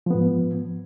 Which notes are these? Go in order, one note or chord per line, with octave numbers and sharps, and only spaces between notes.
G#2 F3 B3